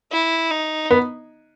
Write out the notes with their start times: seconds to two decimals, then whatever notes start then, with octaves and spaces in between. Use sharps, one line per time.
0.11 E4
0.51 D#4
0.90 B3